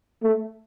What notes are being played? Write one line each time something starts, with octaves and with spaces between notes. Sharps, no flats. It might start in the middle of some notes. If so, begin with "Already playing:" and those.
A3